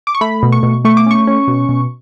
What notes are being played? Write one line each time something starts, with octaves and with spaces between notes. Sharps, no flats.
D6
C#6
A3 B5
B2
C#6
B2
A3 C#6
D6
C#4 C#6
C#4
B2
B2